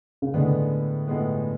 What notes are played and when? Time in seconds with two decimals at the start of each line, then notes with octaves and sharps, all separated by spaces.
0.22 C#3
0.34 A2 D3 G#3 B3
1.08 A2 G#3 B3